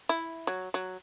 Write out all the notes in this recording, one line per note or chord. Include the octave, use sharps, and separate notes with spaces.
E4
F#3
F#3